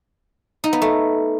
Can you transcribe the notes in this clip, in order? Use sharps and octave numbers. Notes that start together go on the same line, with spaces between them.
D#4
B3
A3